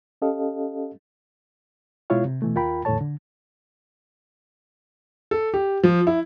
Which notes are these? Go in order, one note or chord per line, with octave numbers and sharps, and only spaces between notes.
C#4 G4 A4 D#5 F5
B2 G#3 E4 F4 C#5 F5
C3
B2 E3 A3
D#2 F4 A#4 G5 B5
E2 A2 D3 A4 C#5 A5
D3
A4
G4
F3
E4